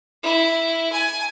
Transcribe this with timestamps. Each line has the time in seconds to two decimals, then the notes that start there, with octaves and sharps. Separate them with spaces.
0.23 E4
0.92 G#5